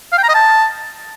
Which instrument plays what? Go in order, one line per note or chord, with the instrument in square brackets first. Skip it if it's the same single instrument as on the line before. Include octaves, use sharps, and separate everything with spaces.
[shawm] F5
G5
A#5
D#5
A5